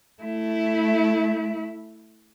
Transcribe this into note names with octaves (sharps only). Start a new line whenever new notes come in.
A3 E4